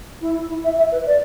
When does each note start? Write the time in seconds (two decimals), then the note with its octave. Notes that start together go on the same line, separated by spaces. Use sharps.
0.21 E4
0.49 E4
0.64 E5
0.78 E5
0.92 B4
1.06 D5